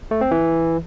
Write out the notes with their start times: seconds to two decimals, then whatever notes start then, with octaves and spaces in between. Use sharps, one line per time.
0.11 A3
0.21 C4
0.31 E3